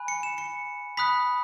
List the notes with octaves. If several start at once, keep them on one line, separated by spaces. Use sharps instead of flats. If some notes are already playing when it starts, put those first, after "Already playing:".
Already playing: G#5 B5 F#6
C#7
E7
C#7
B5 D#6 F#6 B6